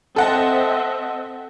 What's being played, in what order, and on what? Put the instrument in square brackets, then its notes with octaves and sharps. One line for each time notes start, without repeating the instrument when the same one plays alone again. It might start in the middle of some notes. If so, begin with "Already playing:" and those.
[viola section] C4 D#5 E5 [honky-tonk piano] A4 F#5 A5